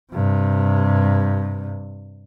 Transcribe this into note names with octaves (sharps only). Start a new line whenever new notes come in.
G2 C3